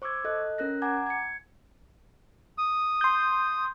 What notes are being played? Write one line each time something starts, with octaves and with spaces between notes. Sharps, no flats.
C5 C#6 D6 E6 G#6
A4 D#5 F#6
C#4 A#4 F#6 A#6
F#5 G#5 A#5 D6 G#6
G#6 C#7
D#6
C6 G6